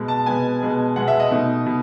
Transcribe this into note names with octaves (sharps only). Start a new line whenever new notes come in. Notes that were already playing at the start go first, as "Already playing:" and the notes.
Already playing: B2 G#3 B3
A5
B2 G#3 B3 G#5
B2 G#3 B3
B2 G#3 B3 F#5
E5
D#5
B2 A3 D#4
B2